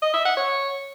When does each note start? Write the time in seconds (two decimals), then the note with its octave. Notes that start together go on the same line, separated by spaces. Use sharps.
0.02 D#5
0.14 E5
0.25 F#5
0.37 C#5